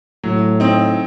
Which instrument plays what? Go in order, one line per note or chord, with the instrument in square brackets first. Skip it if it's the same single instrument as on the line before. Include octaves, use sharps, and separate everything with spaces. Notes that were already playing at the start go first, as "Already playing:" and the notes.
[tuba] A2 [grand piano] F#3
[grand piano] C4 D#4